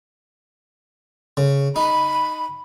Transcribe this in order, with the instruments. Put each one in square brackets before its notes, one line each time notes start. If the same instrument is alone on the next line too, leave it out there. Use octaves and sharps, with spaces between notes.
[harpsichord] C#3
[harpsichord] D#4 [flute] B5